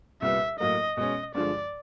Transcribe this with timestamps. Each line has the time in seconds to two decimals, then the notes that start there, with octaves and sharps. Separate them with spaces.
0.22 C2 A#2 G3 B3 E5
0.59 A2 F#3 A#3 D#5
0.97 B2 G#3 C#4 D#5
1.35 G2 D3 F3 G#3 D5